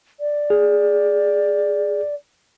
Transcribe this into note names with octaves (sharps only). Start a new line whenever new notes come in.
D5
G#4